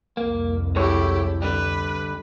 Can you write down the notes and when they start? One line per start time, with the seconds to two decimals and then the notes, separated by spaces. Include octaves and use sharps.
0.17 C2 F2 A#3
0.76 G#3 E4 G4 A4 C#5
1.42 D3 G3 B4